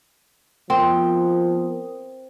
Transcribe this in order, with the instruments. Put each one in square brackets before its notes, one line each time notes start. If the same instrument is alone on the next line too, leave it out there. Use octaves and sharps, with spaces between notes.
[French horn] F3 [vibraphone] B3 A#4 D#6 [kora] C4